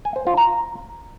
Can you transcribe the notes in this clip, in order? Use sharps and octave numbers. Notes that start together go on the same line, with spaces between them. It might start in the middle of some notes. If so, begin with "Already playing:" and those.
G#5
C5
F4
A#5